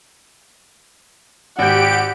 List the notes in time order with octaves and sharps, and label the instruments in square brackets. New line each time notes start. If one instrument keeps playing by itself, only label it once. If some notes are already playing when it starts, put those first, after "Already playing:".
[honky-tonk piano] G#1 G6 [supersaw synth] G4 D7 [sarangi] F#5